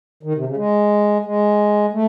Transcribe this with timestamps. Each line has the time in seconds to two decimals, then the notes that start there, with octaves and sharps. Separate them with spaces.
0.23 D#3
0.35 C3
0.46 C#3
0.57 G#3
1.25 G#3
1.93 A3